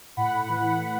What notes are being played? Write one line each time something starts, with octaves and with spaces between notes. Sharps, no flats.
A2 F#5 B5
E3
A2